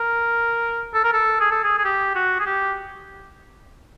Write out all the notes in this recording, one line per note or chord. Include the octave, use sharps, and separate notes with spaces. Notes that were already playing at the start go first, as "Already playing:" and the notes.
Already playing: A#4
A4
A#4
A4
G#4
A4
G#4
G#4
G4
F#4
G#4
G4